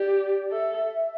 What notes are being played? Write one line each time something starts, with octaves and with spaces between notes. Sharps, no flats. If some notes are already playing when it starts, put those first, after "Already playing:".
Already playing: G4 D5
A4 E5